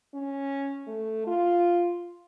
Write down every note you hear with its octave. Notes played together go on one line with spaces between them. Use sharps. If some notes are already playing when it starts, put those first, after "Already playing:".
C#4
A3
F4